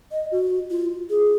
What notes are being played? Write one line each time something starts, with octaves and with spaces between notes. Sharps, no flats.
D#5
F#4
F4
G#4